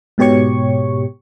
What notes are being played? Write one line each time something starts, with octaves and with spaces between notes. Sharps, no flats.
G#2 B2 G4 C#5 C#6